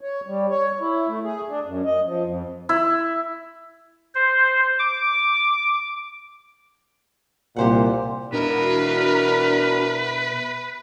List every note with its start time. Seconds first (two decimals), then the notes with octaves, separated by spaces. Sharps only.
0.01 C#5
0.27 G3
0.50 C#5
0.80 E4
1.08 A3
1.24 G#4
1.49 D4
1.66 F#2
1.85 D#5
2.06 F3
2.24 F2
2.69 E4
4.15 C5
4.79 D6
7.56 C2 A#2 G4 C5 F#5
8.33 B2 D4 E4 F#4 A#4 B4